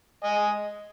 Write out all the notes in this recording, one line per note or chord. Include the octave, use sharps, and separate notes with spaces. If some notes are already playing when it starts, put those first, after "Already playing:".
D#5 G#5